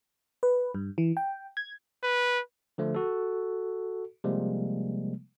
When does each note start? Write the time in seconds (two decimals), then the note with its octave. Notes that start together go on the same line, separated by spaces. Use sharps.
0.43 B4
0.75 G2
0.98 E3
1.17 G5
1.57 G#6
2.03 B4
2.78 D3 F3 A3
2.95 F#4 A4
4.24 C3 F3 G3 G#3 A#3